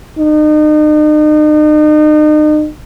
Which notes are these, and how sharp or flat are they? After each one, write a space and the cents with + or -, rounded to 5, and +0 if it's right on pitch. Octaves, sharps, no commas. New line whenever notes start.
D#4 -40